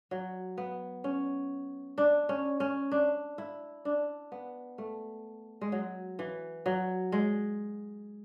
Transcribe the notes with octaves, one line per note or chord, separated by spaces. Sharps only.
F#3
B3
C#4
D4
C#4
C#4
D4
E4
D4
B3
A3
G#3
F#3
E3
F#3
G#3